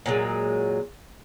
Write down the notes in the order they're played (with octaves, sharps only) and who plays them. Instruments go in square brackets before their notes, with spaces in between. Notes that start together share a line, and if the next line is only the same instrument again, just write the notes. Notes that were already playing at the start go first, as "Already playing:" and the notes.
[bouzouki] A#2 F#3 G#3